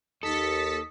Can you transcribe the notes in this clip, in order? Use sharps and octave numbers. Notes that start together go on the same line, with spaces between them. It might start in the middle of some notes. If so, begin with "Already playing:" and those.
D#2 A4 D#5 A6 B6 C#7